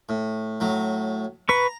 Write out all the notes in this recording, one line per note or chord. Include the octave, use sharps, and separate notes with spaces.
A2
A2 F#3
B4 A#5 C#6